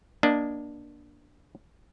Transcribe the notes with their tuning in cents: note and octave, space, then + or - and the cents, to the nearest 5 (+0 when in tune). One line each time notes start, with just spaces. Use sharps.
A#3 +30 D4 +0 D#5 +0